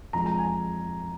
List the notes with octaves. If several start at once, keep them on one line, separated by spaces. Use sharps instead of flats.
F2 F3 G#3 A#5
A#5
G#5